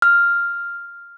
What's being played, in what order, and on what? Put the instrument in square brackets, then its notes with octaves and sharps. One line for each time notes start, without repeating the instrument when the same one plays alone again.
[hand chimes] F6